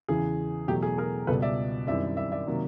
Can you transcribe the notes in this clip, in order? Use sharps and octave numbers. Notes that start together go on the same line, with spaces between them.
E2 C#3 E3 G#4
E2 B2 F#3 A3 G4
G#4
G#4 A#4
C#2 B2 G3 A4 B4
D5 E5
F#2 D#3 G3 C4 E4 D5 E5
D5 E5
D5 E5
C3 D#3 F#3 A#3